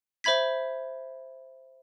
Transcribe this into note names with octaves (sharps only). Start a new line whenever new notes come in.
C5 E5 B5 G#6 B6